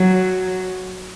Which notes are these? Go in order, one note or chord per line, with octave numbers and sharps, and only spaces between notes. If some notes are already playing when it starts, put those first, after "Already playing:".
Already playing: F#3